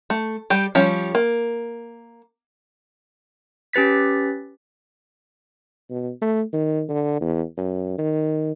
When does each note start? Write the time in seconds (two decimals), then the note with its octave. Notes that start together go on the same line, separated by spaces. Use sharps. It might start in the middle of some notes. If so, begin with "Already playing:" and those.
0.10 A3
0.50 G3 G4
0.75 F3 G3 C#4
1.15 A#3
3.73 C#4 G4 B4 A6 B6
5.90 B2
6.22 A3
6.53 D#3
6.89 D3
7.21 E2
7.58 F#2
7.98 D#3